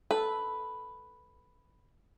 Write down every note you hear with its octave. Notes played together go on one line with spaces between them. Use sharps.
A4 B4